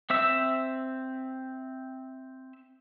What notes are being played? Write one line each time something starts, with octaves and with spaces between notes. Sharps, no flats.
C4 E5 E6